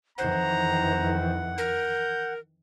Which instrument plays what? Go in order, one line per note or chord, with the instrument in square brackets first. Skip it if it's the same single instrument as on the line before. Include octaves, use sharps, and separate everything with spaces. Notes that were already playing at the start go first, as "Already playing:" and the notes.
[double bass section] F2 D#3 E3 [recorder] C5 [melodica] F#5 [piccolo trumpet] A#5
[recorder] A#4 [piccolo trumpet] G6